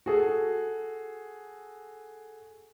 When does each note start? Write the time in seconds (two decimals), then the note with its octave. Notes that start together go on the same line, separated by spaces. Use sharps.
0.06 F#4 G#4 A4